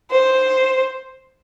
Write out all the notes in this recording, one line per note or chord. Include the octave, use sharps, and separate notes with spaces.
C5